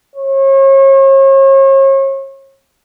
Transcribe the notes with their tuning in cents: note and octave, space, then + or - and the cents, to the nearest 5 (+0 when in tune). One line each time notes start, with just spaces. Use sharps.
C#5 -40